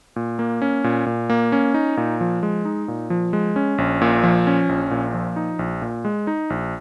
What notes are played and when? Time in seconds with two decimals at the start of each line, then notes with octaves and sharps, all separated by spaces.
0.16 A#2
0.39 A#3
0.62 C#4
0.84 A#2
1.06 A#2
1.30 A#3
1.52 C#4
1.74 D#4
1.97 A#2
2.21 F3
2.43 G#3
2.65 D#4
2.88 A#2
3.10 F3
3.33 G#3
3.56 C#4
3.78 A#1
4.02 A#2
4.24 F3
4.47 C#4
4.69 A#1
4.91 A#2
5.14 F3
5.36 D#4
5.59 A#1
5.82 A#2
6.05 G#3
6.27 D#4
6.50 A#1